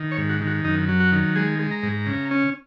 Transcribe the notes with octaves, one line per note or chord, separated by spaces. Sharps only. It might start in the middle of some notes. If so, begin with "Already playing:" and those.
Already playing: D#3
C#5
G#2
F#4
D#3
F#4
F#2 D#4
F#3
F#4
D#3
G#3 G#4
G#3
A#5
G#2
C#3
C#4